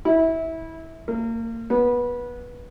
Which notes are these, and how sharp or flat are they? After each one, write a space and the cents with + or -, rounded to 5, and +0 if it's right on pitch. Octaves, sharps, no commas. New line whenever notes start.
E4 -20
A#3 -30
B3 -20